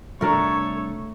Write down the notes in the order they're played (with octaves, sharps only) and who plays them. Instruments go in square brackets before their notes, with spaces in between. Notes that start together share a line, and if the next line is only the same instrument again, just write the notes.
[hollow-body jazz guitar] C2 D4 [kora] A3 A#4 [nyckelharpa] A4 C#5